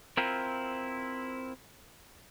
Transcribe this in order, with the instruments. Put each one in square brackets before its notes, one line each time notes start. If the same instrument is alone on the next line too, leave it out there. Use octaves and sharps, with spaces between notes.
[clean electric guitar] C4 E4 F4 A#4 C5